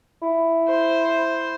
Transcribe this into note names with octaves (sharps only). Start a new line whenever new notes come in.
E4
C5